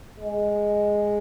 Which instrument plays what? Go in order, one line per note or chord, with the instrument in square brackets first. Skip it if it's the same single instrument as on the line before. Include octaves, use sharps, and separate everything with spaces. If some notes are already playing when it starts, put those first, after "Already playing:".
[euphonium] G#3